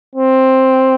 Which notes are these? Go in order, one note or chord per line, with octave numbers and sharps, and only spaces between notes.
C4